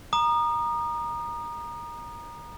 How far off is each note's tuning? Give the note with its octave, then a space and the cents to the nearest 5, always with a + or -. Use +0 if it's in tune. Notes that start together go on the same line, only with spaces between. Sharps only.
A#5 +15 D#6 -30